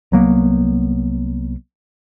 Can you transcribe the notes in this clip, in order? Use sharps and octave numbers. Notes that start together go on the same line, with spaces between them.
C2 F#3 A#3 B3